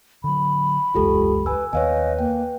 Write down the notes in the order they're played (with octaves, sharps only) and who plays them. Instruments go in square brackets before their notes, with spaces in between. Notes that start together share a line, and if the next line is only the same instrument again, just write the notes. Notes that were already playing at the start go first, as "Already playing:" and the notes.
[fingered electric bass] D3 F#3 [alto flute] B5
[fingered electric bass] E1 C#2 F#2 [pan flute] G#3 [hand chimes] F4 G4 A4
[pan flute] B4 [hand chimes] G#5 E6
[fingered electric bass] D#2 D#3 B3 [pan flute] B4 [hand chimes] C#5 F5 G#5 [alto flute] D#5
[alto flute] A#3 [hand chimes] G5